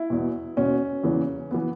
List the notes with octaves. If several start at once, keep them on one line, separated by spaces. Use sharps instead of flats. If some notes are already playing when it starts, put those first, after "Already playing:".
Already playing: E4
E2 B2
E2 B2 C#4
E2 C#3 E3
E3 B3